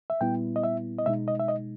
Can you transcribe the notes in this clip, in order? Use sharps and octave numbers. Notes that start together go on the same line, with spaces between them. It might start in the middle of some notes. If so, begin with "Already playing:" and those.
E5
A#2 G3 B3 E4 G5
D#5
E5
D#5
B2 G#3 D#4 E5
D#5
E5
D#5